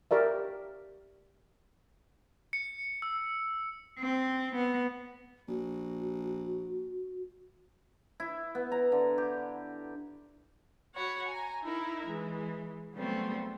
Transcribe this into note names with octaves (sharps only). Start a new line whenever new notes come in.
G4 A#4 D5 E5
C#7
E6
C4
B3
A#1 F#4
E4
B3
A#5
D3
G4
F#4 C#5 F#5 B5
G#5 A#5
D#4 E4 A#4 E5
E3 G#3
C#3 F#3 G3 A3 B3 C4